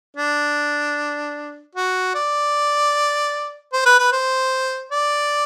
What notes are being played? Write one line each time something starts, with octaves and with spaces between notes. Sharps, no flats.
D4
F#4
D5
C5
B4
B4
C5
D5